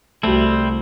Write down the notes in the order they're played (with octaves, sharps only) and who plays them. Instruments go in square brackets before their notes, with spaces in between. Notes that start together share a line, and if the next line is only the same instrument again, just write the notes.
[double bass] C2 [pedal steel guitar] G3 C4 E4 [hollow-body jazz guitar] A3 [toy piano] F#4 A5